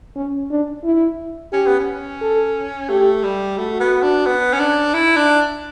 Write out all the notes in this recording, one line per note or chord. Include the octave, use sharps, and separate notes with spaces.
C#4
D4
E4
C#4 G4
B3
C#4
A4
A3 G4
G3
A3 F#4
B3
D4
B3
C#4
D4
E4
D4